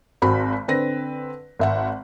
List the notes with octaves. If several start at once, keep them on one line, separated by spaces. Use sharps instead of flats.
G#1 C4 F#4 B5 B6
D3 C4 B4 A#6
G#1 E5 F#5